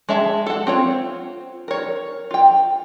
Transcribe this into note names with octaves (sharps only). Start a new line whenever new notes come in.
G#3 C#5 E5 A5
A4 F#5
C4 F4 C#5
A#4 C#5
F4 G5